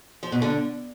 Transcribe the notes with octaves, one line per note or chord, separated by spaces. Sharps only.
F3
B2
D3